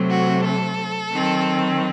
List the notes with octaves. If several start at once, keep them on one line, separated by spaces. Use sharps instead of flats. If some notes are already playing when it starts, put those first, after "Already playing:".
Already playing: C3 F#3 A3 C4
F#4
A4
D#3 F#3 C4